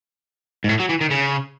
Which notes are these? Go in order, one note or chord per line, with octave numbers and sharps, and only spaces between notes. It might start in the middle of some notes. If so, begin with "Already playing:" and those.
G#2
A2
F#3
E3
D#3
C#3